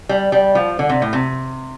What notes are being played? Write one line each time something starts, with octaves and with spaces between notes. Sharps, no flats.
G3
G3
F3
D3
C3
A2
C3